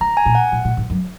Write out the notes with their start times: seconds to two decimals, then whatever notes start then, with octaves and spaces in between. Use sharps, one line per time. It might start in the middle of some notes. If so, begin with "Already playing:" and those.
0.01 D3 A#5
0.17 G#5
0.26 A#2
0.35 F#5
0.52 A#2
0.65 A#2
0.77 G#2
0.90 F#2